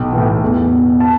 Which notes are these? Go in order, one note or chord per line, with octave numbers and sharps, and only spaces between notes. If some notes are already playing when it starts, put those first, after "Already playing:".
Already playing: B1 G5
A2 E3
E2
B2
A5